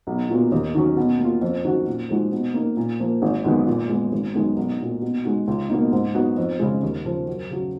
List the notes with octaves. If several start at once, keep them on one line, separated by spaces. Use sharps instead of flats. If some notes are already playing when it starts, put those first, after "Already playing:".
B1
A#2 F#3 B3 F4
D#2
D#3 F#3 C#4
B2
A#3
F4
F2
D#3 F#3 C#4 F#4
A#2
F3 G#3 D#4 F#4
B2
A#3 D#4
A#2
F3 A#3
G#1
F#2 D#3 G#3 B3
A#2
G#3 B3
G#1
F#2 D#3 G#3 B3
B1
A#2 F#3
B2
G#3 D#4 F#4
C#2
B2 A#3 D#4
G#2
F#3 B3 D#4 F#4
F2
C#3 G#3
D#2
C#3 F3
F#2
C#3 F#3